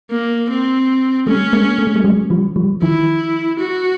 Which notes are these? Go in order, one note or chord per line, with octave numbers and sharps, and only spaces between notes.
A#3
C4
G3 A3 C#4
G#3 A#3
A3
G#3
G3 A3
F#3 G#3
F3 G3
F3 G3
D#3 F3 E4
F#4